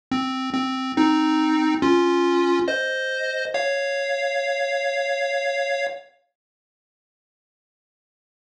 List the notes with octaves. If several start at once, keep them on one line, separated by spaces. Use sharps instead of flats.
C4
C4
C4 D#4
C#4 F4
C5 D#5
C#5 F5